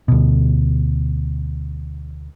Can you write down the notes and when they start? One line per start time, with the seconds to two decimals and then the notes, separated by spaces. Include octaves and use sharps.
0.08 D2 B2